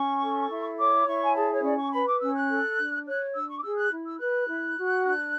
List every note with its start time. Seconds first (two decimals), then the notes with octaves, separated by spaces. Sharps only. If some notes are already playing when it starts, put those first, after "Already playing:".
Already playing: C#4 C#6
0.21 A4
0.49 E4
0.78 C#5 D6
1.06 E4 C#6
1.24 G#5
1.35 G#4 A5
1.49 C#5
1.63 C#4 D5
1.77 C#6
1.91 B4 B5
2.06 D6
2.20 C#4 E6
2.35 F#6
2.48 A4
2.77 D4
3.05 C#5 F#6
3.33 D4 E6
3.47 C#6
3.57 D6
3.62 G#4 E6
3.76 F#6
3.90 E4
4.05 E6
4.19 B4 F#6
4.47 E4
4.75 F#4
5.04 D4